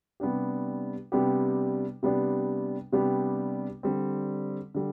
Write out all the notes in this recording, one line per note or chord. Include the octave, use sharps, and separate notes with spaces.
C3 G3 B3 D4 G4
C3 G3 B3 D4 G4
C3 G3 B3 D4 G4
C3 G3 B3 D4 G4
D3 G3 C4
D3 G3